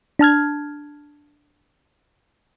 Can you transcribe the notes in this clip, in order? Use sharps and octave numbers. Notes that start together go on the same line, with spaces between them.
D4 A5 F6 G#6